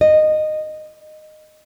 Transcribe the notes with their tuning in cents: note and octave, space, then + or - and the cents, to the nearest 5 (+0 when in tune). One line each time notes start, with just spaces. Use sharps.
D#5 -15